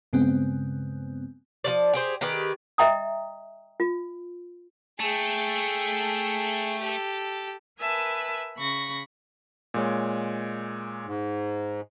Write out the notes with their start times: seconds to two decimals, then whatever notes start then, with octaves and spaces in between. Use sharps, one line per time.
0.13 G2 C#3 G#3 B3 C4
1.64 F3 G3 D5
1.94 G4 G#4 C5
2.21 D#3 G4 G#4 B4
2.78 D#5 E5 G5 A#5 D#6
3.80 F4
5.00 A3 G#4 G5
6.81 G4 A4
7.80 A#4 B4 E5 G#5 A5
8.56 C#3 B5 C#6 A#6
9.74 A#2 G#3 C#5
11.05 G#2